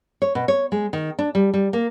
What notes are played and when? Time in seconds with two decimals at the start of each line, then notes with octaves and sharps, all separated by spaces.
0.22 C#5
0.35 B2
0.48 C#5
0.72 G#3
0.93 D#3
1.19 D4
1.35 G3
1.54 G3
1.73 A#3